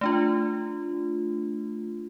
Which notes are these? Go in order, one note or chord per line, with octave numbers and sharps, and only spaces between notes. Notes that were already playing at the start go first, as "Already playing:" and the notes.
A3 D4 F4